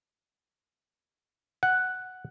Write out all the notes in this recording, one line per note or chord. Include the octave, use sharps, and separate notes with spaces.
F#5